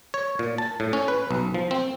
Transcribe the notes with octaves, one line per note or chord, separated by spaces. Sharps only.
C#5
A#2
A5
A2
C#4
B4
B1
F3
C4